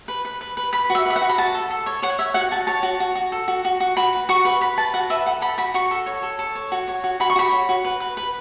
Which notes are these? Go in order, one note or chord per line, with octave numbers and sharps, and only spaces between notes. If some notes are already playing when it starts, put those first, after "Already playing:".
B4
B4
B4
B4
B4 B5
F#4
E5
B4 E5
F#5
F#4
B5
F#4 A5
A4
A4
C#5
C#5 F#5
C#5 E5
F#4 F#5
F#4 A5
C#5 A5
F#4
F#4
F#4
A4
F#4
F#4
F#4
F#4 B5
B4
F#4 C#6
B4
B4 B5
B4 A5
F#4 F#5
B4 E5
A4 F#5
A4 B5
F#4 B5
F#4 C#6
A4
C#5
A4
A4
C#5
F#4
C#5
F#4
F#4 B5
C#6
F#4 B5
C#5
F#4
B4
B4
B4